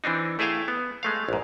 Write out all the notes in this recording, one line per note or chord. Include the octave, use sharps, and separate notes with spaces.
E3 C4 D4 D#4
A3 E4 G#4 E5 F5 G5
B3
G#3 A3 F5
A#1 G#2